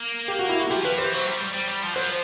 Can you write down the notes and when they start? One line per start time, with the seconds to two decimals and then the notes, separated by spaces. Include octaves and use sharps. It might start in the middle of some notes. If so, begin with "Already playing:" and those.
Already playing: A#3
0.28 G4
0.39 F#4
0.49 E4
0.60 F#4
0.70 F3 G4
0.85 F3 B4
0.98 E3 C5
1.13 F#3
1.26 G3
1.41 G3
1.54 G3
1.68 G3
1.82 F3
1.93 F#3 C5
2.04 F3